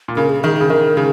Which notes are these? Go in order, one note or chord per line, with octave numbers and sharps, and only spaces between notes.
A#2
C#3 A#4
G#4
D#3 G#4
C#3 G#4
D#3 A#4
C#3 G#4